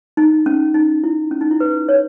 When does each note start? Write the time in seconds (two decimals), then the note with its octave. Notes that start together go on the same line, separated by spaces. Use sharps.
0.17 D#4
0.46 C#4
0.74 D#4
1.04 E4
1.31 C#4
1.41 D#4
1.51 E4
1.60 B4
1.89 C#5